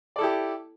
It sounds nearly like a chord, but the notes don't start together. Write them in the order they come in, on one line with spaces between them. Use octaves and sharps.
D5 A4 E4 G4